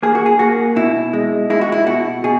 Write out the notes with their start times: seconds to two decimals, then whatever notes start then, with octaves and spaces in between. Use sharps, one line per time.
0.03 A#3 G#4
0.15 F#4
0.26 G#4
0.39 A#3 F#4
0.76 B2 E4
1.13 G#3
1.50 G#3 E4
1.61 F#4
1.72 E4
1.87 B2 F#4
2.24 B2 G#4